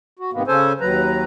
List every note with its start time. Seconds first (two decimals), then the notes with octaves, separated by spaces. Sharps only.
0.19 F#4
0.33 G#2 C3 D#3 A#3 B3
0.47 C#3 C#4 A4 C5 G#5
0.81 D#2 F#3 B4 A#5